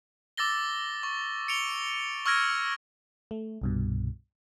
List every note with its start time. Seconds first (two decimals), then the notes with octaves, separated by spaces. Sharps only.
0.37 D6 E6 A6 A#6 G7
1.03 C#6
1.48 C#7 D7 F7 G7
2.26 C#6 E6 F6 G#6 A#6 D7
3.31 A3
3.62 C2 G2 B2